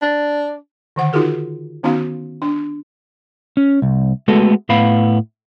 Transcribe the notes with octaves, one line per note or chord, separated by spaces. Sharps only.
D4
D3 D#3 F#5
D#4 F4 F#4 G#4 A#4
D#3 B3 C#4 D#4 F#4 F5
D4
C#4
C2
G#3 A3 B3 F#4 A4
A2 B3 F5 B5